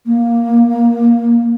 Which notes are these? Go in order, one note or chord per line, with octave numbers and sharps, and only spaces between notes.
A#3